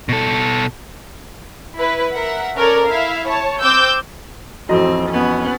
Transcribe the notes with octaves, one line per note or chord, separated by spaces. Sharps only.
B2 A4
E4 B4
A#4 E5 F#5
C#4 A4 A#4 C#5 D5
E4 E5 F5
C#5 A5
C4 D6 E6 G6
A1 F2 C4 E4 F#4 A4 D#5
B3 C#4